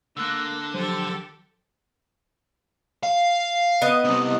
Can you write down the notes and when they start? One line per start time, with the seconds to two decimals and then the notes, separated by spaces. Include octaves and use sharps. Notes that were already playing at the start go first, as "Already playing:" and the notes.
0.17 D3 A#3 E6 F#6
0.74 D#3 F3 F#3 G4 A4 C5
3.03 F5
3.82 B3 D#5
4.04 C3 G3